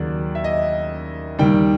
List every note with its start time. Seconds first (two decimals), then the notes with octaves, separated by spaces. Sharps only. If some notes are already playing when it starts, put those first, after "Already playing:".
Already playing: D#2 C#3 F#3 D5
0.35 E5
0.44 D#5
1.39 D#2 D#3 G3 G5